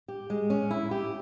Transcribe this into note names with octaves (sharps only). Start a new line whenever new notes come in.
G4
G#3
C#4
E4
G4